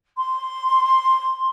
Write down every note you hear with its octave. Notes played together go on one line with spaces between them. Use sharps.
C6